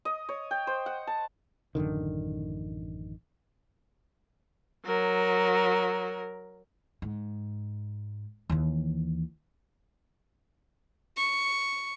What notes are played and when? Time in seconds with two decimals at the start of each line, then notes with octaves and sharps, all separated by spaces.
0.05 D#5
0.29 C#5
0.51 G5
0.67 C5
0.86 F#5
1.07 A5
1.75 A1 F#2 D3 D#3
4.86 F#3 A#4
7.02 G#2
8.49 D#2 E3
11.17 C#6